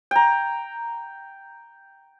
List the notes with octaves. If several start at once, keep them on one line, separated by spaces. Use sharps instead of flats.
G5 A#5